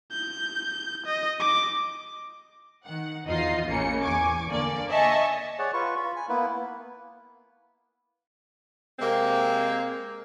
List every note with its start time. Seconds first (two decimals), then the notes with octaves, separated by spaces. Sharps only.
0.11 G6
1.06 D#5
1.40 D6
2.84 D#3 F#5
3.26 E2 D#4 F4 D#5 C7
3.68 A1 C#3 A#3 C#7
4.03 E2 G#5 C#6 D6
4.48 D3 A#3 D5
4.89 D#5 E5 G#5 A5 C#6
5.59 G#4 C#5 D5 F#5
5.74 F4 B4 C#6
5.97 F4 B5
6.16 G#5
6.29 A#3 B3 E4 B4
8.99 C3 G#3 A#3 C4